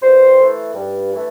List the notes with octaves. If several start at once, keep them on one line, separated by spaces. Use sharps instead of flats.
G2 C5
E3 A3
G2
E3 A3